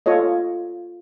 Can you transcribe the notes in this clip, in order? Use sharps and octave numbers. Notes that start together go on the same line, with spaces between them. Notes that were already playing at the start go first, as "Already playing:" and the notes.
F4 A4 C#5 D#5